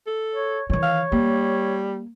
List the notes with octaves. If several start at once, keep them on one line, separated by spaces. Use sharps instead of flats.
A4
C#5
D#3 E3 C#5
F5
G3 A#3